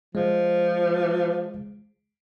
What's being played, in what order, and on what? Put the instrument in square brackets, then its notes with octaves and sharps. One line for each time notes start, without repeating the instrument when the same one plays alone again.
[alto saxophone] F3 [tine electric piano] G#3